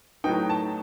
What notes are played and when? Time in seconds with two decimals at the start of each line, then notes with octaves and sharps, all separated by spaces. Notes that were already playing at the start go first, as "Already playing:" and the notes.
0.24 A2 F#3 B3 D#4 G5
0.50 A5